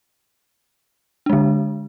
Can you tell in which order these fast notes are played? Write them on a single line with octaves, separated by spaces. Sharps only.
D4 G#3 D3